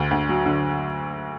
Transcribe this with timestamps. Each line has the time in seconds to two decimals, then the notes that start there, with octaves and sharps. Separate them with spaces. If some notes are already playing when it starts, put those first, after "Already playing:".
Already playing: D2 D3
0.11 D2
0.29 F#3
0.46 D3